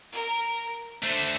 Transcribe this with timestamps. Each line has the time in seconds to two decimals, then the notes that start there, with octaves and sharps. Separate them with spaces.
0.12 A#4
1.03 A3 D4 C5